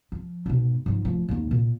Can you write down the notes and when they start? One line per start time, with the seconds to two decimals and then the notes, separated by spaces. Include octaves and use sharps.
0.12 F3
0.46 G#2 B2
0.86 G#2 F3
1.05 D1 F3
1.29 D#2 G#2
1.51 A#2